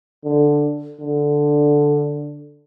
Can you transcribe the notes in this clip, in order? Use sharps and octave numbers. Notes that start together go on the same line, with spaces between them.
D3
D3